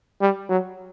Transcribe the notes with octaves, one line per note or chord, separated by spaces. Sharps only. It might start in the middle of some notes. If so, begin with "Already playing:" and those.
G3
F#3